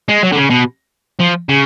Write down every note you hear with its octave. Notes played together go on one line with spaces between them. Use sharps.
G#3
F#3
D3
C#3
B2
F3
C#3